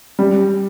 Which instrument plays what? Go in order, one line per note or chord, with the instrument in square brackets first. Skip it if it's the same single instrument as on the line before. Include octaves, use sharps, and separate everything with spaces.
[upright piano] G3